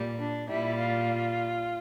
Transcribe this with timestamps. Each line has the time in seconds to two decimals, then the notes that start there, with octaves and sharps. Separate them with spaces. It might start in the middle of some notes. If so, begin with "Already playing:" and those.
Already playing: A#2 G3
0.20 D4
0.49 A#2 G3 E4
0.78 F4